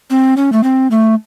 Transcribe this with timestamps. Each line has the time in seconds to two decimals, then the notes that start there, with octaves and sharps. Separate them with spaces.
0.10 C4
0.37 C#4
0.52 A3
0.63 C4
0.91 A3